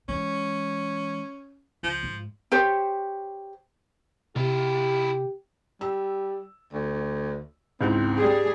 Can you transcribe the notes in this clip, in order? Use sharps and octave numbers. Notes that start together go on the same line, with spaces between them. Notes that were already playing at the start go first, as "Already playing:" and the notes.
E3 G#3 C#4
C#2 F3
G#2
G4 C5 C#5
C3 E4 F4 G4
G3 E6
D2
C#2 G#2 C4 E4
G3 D4 G4 G#4